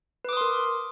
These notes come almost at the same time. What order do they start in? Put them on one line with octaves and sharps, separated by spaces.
B4 D6 D#6 C6 A#4